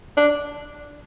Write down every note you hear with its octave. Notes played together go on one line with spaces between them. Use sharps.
D4